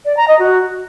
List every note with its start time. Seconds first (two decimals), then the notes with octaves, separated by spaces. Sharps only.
0.06 D5
0.17 A#5
0.28 D#5
0.39 F#4